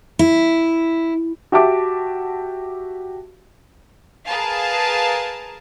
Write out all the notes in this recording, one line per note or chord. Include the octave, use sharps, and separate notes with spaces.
E4
F#4 G4 E5 A5 D6
G#4 A#4 B4 F5 A5